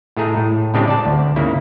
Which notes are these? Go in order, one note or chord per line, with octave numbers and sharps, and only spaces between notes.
A2 A3 G#4 A#5
A2
A2 C#3 G#3 C4 D4 G4
D5 A5
D2
G#2 C#3 A#3 E4